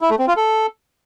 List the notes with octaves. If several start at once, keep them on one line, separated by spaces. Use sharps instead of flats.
E4
A3
C4
F4
A4